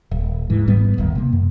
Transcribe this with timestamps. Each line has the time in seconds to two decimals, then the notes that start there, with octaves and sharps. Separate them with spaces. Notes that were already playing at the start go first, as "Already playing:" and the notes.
0.11 D#1
0.50 G#2 E3
0.67 G#1 G#2 G3 B3
0.97 D1 G1 D#2 D#3
1.15 C3 A#3
1.33 F#2